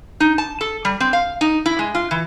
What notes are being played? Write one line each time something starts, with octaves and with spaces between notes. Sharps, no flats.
D#4
A5
A4
G3
C4
F5
D#4
E4
G#3
F4
E3